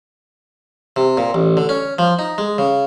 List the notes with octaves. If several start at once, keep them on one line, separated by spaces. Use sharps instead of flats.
C3
A#2
A1
D3
C#4
F3
D#4
G#3
C#3